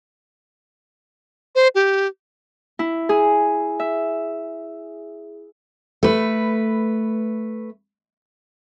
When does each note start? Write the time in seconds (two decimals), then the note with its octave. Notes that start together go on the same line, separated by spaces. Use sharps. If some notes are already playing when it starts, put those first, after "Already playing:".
1.55 C5
1.75 G4
2.79 E4
3.09 G#4
3.80 E5
6.03 A3 B4